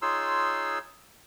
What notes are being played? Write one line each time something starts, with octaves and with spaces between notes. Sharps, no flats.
D#4 F4 G#4 C#5 C6 E6